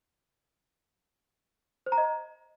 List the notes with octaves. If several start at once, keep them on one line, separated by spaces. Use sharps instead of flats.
C5
A#5
D#5